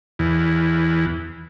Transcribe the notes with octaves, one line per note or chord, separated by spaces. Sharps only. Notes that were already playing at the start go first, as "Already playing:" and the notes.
E2